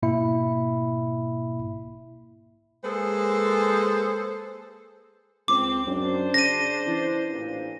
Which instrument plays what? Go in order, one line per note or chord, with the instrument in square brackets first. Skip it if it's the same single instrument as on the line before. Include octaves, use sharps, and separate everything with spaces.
[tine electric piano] G#2 B2 A#3 E4 E5 B5
[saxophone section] G#3 A#3 G#4 A4 B4 C5
[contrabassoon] C#2 [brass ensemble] C4 [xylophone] D6
[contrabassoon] F#2 [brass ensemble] D4 C5
[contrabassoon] C#3 [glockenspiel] A#6 D#7
[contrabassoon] E3
[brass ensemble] A1 A#2